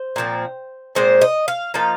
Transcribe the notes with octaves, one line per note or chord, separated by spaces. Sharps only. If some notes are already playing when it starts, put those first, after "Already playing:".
Already playing: C5
A#2 F3 C4
A#2 G#3 C4 C5
D#5
F5
F3 A#3 D#4 F5